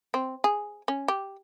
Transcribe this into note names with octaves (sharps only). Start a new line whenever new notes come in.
C4
G#4
C#4
G4